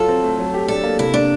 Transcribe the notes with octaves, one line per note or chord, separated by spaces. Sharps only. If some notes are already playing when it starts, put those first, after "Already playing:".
Already playing: F#3 F4 A4
C4
A3
F#3
G4
D4 A4
A#3
C3 E4
A#3 D4